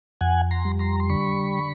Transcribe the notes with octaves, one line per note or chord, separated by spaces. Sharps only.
F2 F#5 G#5
A#5 C6
G3
A#5 C6
C6
D3 B5 C#6